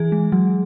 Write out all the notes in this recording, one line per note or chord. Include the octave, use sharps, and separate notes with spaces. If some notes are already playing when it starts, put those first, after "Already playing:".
Already playing: E3 G#4
G#3
F#3